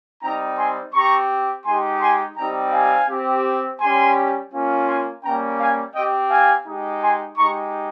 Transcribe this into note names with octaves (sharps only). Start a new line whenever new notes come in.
G3 C4 D#4 G5 A#5
G#5 C6
C4 G4 A#5 C#6
G#3 D#4 G4 G#5 C6
G#5 C6
G3 C4 D#4 G4 G5 A#5
F5 G#5
C4 G4
G3 C#4 G4 G#5 C6
A#3 C#4 F4
G#5 C6
G3 A#3 C#4 G5 A#5
F5 G#5
C4 G4 D#5 G5
F5 G#5
G#3 D#4 G4
G#5 C6
G#3 D#4 G4 A#5 C#6